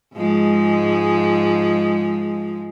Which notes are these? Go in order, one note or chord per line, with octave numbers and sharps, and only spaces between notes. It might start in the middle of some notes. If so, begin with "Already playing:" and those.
G#2 F3 G#3